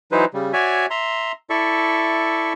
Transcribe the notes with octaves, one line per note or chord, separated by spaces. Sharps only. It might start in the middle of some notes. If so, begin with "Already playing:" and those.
E3 F#3 D#4 B4 C5
C#3 G3
F#4 C#5 D5 E5 G#5
E5 A#5 C6
E4 A4 D5 E5 C#6